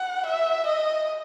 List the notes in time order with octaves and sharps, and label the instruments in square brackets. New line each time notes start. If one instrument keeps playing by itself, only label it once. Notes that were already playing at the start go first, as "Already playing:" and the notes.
Already playing: [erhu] F#5
E5
D#5